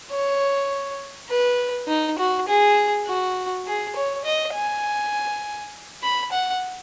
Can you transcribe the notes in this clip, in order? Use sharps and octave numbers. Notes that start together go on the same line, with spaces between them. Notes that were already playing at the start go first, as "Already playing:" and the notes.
C#5
B4
D#4
F#4
G#4
F#4
G#4
C#5
D#5
G#5
B5
F#5